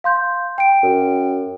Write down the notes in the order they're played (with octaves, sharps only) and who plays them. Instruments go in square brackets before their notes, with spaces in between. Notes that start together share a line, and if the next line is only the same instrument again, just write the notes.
[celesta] F5 C6 G6
G5 D7
[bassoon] F#2